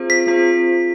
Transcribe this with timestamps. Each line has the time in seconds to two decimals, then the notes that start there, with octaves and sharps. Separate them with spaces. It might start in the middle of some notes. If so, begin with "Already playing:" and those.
Already playing: C4 F4 G#4 C5
0.10 B6
0.27 C4 F4 G#4 C5